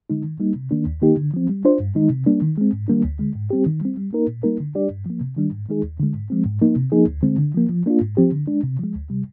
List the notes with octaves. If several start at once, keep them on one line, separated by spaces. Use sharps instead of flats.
D3 G#3 D#4
D#3
G3 A#3 D#4
C3
D#3 A#3 D4
D#2
D#3 A#3 D#4 G4
D3
F3 C4
G3
D4 F4 C5
G2
D#3 G#3 D#4
C3
G3 A#3 D4
D#3
G#3 C4
G#2
D#3 G3 A#3 D4
D2
D3 G#3
G#2
G3 C4 G4
D#3
G3 C4
G3
A#3 D#4 A#4
A#2
G3 A#3 D#4 A#4
D3
G3 D4 G4 D5
G2
F3 A#3
C3
D#3 G3 D4
G#2
D#3 G#3 D#4 G#4
D#2
D3 G#3
G#2
F3 G#3 C4
G#2
F3 A#3 D#4
C3
F3 A#3 D#4 G#4
D2
D3 G#3 C4
D3
F3 A#3
F3
A#3 D4 F4
G#2
F3 C4 G4
D3
G#3 D4
C3
F3 G#3
D2
C3 G3